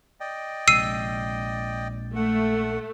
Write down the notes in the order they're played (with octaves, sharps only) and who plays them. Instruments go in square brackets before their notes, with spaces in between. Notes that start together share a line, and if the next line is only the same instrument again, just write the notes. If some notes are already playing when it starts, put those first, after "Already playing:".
[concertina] D5 D#5 G5
[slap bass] A#1 C3 G#3 [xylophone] E6 C7 D#7
[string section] A3 [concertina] F#5